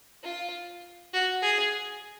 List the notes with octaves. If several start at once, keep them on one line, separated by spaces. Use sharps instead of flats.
F4
F#4
G#4